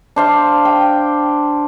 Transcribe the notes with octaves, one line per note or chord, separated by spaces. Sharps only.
D4 C5 F5
G5